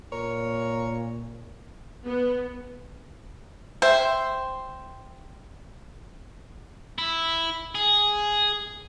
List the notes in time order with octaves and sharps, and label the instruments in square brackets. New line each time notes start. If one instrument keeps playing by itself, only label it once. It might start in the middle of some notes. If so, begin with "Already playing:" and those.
[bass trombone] A#2 [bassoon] A#4 [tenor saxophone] C#5
[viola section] B3
[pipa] C5 [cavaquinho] E5 G5
[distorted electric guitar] E4
G#4